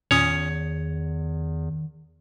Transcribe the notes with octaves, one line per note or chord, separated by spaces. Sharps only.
E2 A#2 D#3 C#4 C#5 D#6